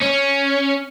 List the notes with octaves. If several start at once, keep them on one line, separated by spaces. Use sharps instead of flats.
C#4